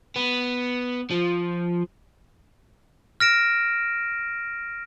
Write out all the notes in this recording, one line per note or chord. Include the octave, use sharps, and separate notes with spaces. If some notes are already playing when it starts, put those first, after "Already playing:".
B3
F3
F6 A#6 D7 E7